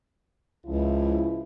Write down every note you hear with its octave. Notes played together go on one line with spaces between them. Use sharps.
C#2 C#3 F3 E4